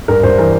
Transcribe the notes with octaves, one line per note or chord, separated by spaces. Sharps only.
G2 A#4
G2 C5
E3 A#4